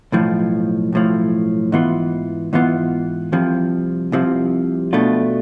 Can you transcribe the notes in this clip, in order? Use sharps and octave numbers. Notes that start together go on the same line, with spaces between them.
B1 A2 F3
B1 A2 F3
G#2 E3 B3 F4
G#2 E3 B3 F4
C2 C3 F3
C2 C3 F3
B2 A3 D4 F4